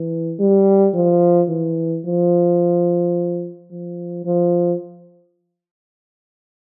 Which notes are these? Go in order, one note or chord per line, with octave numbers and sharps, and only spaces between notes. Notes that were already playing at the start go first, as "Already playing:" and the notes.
Already playing: E3
G3
F3
E3
F3
F3
F3